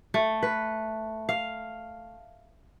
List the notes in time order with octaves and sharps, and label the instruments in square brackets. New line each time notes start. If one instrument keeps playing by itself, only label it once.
[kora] A3
B4
F5